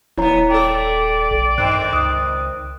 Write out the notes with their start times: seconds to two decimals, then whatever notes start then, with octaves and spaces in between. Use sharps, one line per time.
0.17 D#1 F2 B3 E4 C#5 A#5
0.50 A3 A4 D5 G5
1.31 A#1
1.58 G2 D#3 C4 F#6
1.93 C#2 D#6 F#6